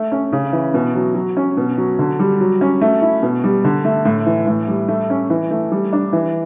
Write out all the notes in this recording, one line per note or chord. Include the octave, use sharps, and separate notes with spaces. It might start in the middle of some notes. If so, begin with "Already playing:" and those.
Already playing: A3
C#4
C#3
E3
B2
F#3
F#3
C#4
B2
F#3
D3
G3
F#3
C#4
A3
E4
B2
G3
D3
A3
A2
E3
A2
G3
A3
C#4
E3
A3
G3
D4
E3